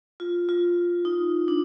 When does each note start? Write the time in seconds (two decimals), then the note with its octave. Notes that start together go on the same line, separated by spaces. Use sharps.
0.20 F4
0.49 F4
1.05 D#4
1.48 D4